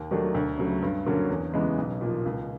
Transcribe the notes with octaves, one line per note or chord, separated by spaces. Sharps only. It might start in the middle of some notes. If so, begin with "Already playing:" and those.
Already playing: D#2
D#3 F#3 A3 D4
D2
C#3 F#3 A3
G2
D3 F#3 A#3 C#4
E2
C#3 E3 G#3 B3
B1
A#2 F3
C#2